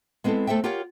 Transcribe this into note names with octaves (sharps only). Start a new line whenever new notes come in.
G#3 B3 C4 E4 A4
A3 A4 C5 E5 G5
F4 G4 A#4 C#5 F#5 G5